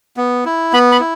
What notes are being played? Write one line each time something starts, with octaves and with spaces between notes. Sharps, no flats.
B3
E4
B3 B5
B5
E4